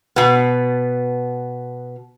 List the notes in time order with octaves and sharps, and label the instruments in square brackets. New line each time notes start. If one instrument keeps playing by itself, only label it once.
[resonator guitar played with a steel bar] B2 B3